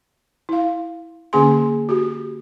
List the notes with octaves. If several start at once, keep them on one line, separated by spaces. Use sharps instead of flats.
E4 F5
D3 A#3 C#4 G#4 G#5 C6
F#4 G4